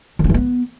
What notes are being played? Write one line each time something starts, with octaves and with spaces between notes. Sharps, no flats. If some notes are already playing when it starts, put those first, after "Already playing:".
D#3
C#4
E3
B3